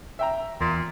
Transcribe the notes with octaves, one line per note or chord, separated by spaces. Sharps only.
E5 G5 A#5
E2 A#2